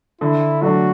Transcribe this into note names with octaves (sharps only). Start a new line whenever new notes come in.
D3 E4
F#3 A3 D4 F#4